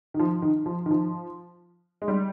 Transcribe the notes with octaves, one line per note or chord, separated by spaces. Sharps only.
D#3
F3
D#3
F3
D#3
F3
G#3
G3